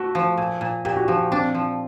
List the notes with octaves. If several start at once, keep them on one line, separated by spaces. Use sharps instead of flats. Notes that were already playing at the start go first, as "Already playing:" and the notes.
Already playing: A3 F#4
F3
A#2
A#2
A#2 G4
F#4
F3 G4
C4 D4
F3